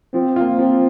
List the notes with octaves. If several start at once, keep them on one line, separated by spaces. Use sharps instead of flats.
F3 C4
A#3 F4
F3 C4